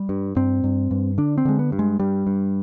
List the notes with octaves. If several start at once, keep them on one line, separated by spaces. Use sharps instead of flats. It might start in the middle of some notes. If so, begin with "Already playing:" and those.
Already playing: G3
G2
G2 C4
G2
G2
D3 D4
C4
D3 G#3
B3
G2
G#3
G2 G3
G2